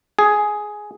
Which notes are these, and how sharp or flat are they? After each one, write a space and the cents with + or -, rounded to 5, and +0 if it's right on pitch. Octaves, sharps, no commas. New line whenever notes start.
G#4 +10